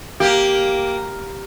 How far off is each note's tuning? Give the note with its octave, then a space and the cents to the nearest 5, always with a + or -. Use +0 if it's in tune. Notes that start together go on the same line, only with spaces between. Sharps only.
A#3 +0 G4 +0